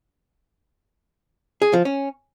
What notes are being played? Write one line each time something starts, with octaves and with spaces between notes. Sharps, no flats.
G#4
F3
C#4